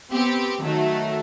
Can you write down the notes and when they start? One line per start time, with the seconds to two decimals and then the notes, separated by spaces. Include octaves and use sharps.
0.12 B3 C4 G4
0.65 D#3 F#3 A3